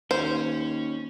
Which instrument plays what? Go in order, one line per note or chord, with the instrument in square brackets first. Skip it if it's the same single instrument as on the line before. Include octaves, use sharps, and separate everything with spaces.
[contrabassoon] D#2 [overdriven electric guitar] C#4 [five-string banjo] C5